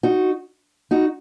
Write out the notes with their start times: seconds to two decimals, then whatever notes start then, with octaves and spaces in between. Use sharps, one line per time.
0.03 D#4 F#4
0.91 D#4 F#4